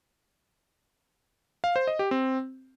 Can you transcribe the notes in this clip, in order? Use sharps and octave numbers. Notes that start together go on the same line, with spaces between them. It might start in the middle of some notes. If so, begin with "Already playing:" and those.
F5
C5
D#5
G4
C4